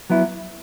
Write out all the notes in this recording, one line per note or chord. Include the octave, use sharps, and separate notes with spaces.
F#3 B3 E4